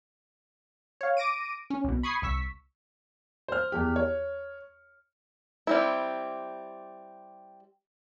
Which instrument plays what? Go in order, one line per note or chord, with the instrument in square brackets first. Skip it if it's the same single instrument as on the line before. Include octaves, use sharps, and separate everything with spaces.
[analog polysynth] C#5 F5
D6 A#6 D7 D#7
C#4
C2 B2
B5 C#6 D#6 G#6 C7
C2 C#6 E6 B6
[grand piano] C5 F6
E2 G4
C#5
[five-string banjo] G3 C4 E4